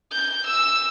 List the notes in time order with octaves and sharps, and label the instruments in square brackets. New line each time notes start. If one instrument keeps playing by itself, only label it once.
[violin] G6
E6